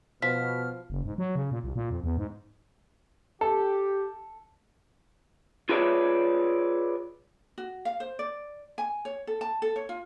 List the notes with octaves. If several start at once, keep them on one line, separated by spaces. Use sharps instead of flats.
B2 F3 F6 B6
F#1
G#2
F#3
C#3
A#2
C2
A#2
F2
E2
G#2
G4 A4
F4 G#4 B4 C#5 D5 E5
F#4
F5
C5
D5
G#5
C#5
A4
A5
A4
C#5
F4